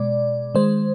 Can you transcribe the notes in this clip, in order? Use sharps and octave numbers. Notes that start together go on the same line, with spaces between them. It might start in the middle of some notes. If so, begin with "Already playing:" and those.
Already playing: B2 G#3 D5
D#3 G#3 C5